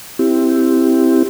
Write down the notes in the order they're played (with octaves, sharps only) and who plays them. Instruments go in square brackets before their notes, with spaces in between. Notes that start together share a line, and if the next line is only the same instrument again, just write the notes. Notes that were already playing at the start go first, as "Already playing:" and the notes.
[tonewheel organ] C4 E4 G4